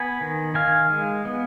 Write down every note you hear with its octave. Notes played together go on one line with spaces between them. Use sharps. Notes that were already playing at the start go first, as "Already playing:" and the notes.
Already playing: B3 G#5 B5
D#3
D#3 F5 G#5
G#3
B3